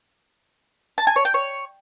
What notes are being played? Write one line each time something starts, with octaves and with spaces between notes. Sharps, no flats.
A5
G#5
C#5
G5
C#5